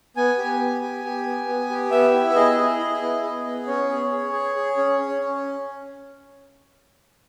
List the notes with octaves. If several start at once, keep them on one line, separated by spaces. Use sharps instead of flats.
B3 G#5
G4
B3
G4
G4
B3
B3
G4
B3 E5
E4
E5
G#4 D#5
G#4
E4
B3
G#4
B3
C#4 C#5
G#4
G#4
G#4
G#4
C#4
C#4
C#4